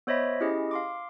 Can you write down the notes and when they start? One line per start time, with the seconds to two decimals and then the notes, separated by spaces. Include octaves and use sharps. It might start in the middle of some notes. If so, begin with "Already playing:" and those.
0.07 B3 C5 C#5 D#5 E5 B5
0.40 C#4 E4 G4 G#4 D#5
0.71 F5 C6 D6